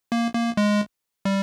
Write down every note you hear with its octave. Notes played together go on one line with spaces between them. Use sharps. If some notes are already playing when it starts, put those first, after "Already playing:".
A#3
A#3
G#3
G3